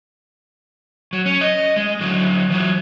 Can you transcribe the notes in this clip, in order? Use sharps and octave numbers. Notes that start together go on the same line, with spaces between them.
F#3
C#4
D#5
G#3
D3 F#3
E3 F#3